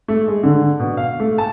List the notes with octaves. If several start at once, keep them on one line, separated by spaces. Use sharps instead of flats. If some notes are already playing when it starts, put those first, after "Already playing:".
A3
G#3
D3
B2
F5
A3
A5